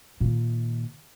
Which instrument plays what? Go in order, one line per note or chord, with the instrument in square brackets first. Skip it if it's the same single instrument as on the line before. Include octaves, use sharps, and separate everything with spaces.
[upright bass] A#2 D#3